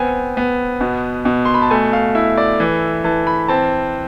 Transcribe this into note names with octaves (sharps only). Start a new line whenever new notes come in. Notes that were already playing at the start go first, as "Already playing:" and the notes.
Already playing: B3 C4 G#5
B3
B2
B2
C6
B5
A5
A3 G#5
F5
E4 E5
D5
E3
E3 A5
B5
C4 A5